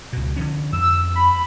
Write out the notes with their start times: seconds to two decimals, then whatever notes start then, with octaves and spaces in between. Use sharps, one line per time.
0.13 C#2 B2
0.37 D3 F3 C#4
0.73 F2 E6
1.15 B5